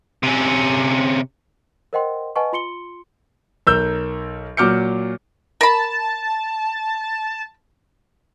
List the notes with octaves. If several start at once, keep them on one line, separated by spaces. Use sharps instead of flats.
C3 C#4
A#4 C5 D#5 F#5 G5 C6
B4 D#5 F#5 G#5 A5 C#6
F4 C6 C#7 G7
B1 A#4 E6 G6
A#2 F#3 D6 F6 G6 C#7
A#4 A5 B5